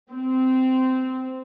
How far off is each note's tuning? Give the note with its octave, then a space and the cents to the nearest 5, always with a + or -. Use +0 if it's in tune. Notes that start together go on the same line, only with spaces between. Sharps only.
C4 -15